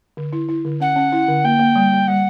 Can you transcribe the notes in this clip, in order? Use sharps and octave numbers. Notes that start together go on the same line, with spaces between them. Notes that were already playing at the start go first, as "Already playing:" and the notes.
D3
E4
E4
D3
C#4 F#5
C#4
E4
D3
A#3 G5
A#3
G3
G3
G3 F#5